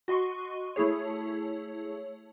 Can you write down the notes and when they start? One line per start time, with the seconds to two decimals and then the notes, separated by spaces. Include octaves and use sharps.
0.08 F#4 D#5 C6 C#6
0.76 A3 E4 G#4 C#5